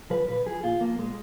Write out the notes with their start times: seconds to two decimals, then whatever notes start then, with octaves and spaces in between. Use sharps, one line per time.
0.10 F3 B4
0.28 A#2 B4
0.46 F3 G#4
0.63 A#2 F4
0.81 F3 A#3
0.99 A#2 G#3